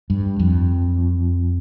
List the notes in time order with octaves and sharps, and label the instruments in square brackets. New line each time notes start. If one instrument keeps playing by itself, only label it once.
[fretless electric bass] G2
F2